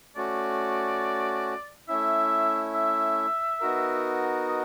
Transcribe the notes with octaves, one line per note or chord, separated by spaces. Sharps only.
A3 C#4 F#4 D5
A3 C#4 E4 E5
E5
B3 D#4 F#4 A#4
D#5